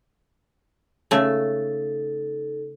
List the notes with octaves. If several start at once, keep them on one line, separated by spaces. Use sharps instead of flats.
C#3 A3 D#4 A4